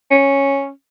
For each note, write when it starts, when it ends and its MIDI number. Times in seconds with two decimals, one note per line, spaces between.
0.11 0.70 61